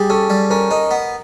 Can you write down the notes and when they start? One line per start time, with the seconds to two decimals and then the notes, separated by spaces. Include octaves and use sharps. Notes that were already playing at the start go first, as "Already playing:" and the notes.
Already playing: G3 G4 G#4
0.10 C#4 A4
0.30 G3
0.50 C#4 A#4
0.71 D#4 A#4
0.91 B3